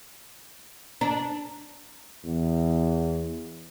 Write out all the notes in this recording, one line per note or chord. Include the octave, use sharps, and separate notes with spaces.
D4 A#5
E2